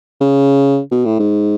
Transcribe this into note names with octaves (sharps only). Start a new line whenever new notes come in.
C#3
B2
A2
G#2